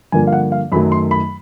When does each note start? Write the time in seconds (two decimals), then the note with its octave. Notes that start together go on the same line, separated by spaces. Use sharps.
0.12 G2 D3 F3 A#3 G#5
0.27 F5
0.33 F#5
0.52 F5
0.72 F#2 D#3 F#3 A3 B5
0.92 C6
1.11 B5